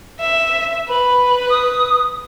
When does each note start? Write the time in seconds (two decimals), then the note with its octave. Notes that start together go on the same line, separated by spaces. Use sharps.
0.20 E5
0.89 B4 B5
1.50 D#6